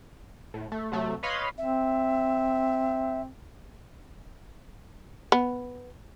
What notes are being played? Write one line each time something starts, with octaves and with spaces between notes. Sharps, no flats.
A2
A3
C3 F#3 A3
B4 C#5 D#5 F5 B5 C6
C4 E5
B3